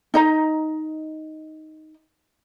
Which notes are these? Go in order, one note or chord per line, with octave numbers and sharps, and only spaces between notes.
D#4 D#5 A#5